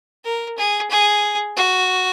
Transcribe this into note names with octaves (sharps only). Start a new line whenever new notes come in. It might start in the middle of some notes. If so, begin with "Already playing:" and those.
A#4
G#4
G#4
F#4